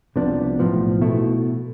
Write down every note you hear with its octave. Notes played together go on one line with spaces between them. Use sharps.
C2 C3 F3 B3 D4
B1 A2 F3 B3
B2 A3 E4